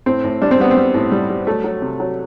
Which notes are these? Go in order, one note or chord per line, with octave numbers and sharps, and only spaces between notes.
A2 C4
A2
G3 D4
C4
G3 B3
C4
G3
A2
G3
G3
F#3 A3
F#3
C3
F#3